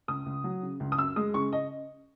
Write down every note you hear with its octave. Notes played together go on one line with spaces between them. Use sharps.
C#2 D#6
C#2
F#3
C#3
C#2
D#6
F#2 E6
G#3 D#6
C#3 C#6
D#5